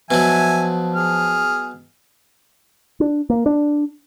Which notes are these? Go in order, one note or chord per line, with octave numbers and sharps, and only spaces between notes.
B2 F3 F#3 E5 G#5
G#4 F6
D4
A#3
D4